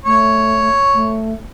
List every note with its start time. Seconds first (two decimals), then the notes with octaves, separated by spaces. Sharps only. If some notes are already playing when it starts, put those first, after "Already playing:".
0.05 A3 C#5
0.94 A3